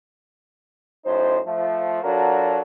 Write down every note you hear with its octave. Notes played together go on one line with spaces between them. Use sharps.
F#2 A2 D#4 C5
F3 A3
F#3 D4 F4 F#4 A4 A#4